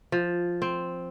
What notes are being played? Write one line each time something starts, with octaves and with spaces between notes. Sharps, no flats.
F3
C4